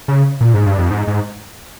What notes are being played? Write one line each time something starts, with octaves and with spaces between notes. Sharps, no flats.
C#3
A#2
G#2
G2
F2
G#2
G#2